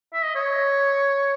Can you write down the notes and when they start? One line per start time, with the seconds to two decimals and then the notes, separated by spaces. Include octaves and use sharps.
0.14 E5
0.24 D#5
0.35 C#5